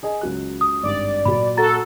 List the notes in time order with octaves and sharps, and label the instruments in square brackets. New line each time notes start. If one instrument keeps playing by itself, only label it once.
[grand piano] G#4 D#5 G#5
C#2 F#3 F#6
[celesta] D#6
[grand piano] G#1 G2 [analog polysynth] D5
[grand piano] A#2 F#3 [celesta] B5
[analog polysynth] F#4 A4 [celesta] A#5 A6